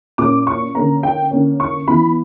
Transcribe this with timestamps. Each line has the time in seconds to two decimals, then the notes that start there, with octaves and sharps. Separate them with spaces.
0.18 A#2 A#3 C#4 D6
0.47 C#6
0.75 D3 A#3 C#4 A#5
1.03 G5
1.31 D3 A#3 C#4
1.60 C#6
1.88 E3 B3 B5